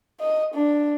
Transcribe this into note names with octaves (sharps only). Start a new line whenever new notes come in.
D#5
D4